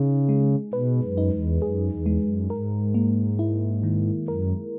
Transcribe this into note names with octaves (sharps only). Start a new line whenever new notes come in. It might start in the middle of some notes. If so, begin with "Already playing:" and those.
Already playing: C#3 D#4 G#4
G#3
B2 B4
F#2
D#4
E2
F#2 G#4
E2
G#3
F#2
G#2 A#4
A#3
E4
D#3
F#2 A#4